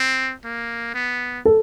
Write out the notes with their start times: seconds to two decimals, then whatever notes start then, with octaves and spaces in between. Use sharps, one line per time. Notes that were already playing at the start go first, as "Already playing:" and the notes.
Already playing: C4
0.44 A#3
0.94 B3
1.45 A4